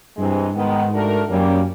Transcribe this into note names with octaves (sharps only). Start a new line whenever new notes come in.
G2 C3 E3 G#3
G#2 D#3 G#3 B3
A3 D4 F#4 A#4
F#2 G3 A#3 C#4